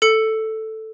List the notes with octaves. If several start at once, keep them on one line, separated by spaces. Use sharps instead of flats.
A4 C#7